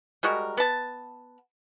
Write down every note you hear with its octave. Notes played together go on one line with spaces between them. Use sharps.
G3 G#3 F#4 A#4
B3 A5